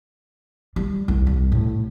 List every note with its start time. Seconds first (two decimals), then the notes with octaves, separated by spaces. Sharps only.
0.76 G3
1.08 C2
1.27 C2
1.52 A2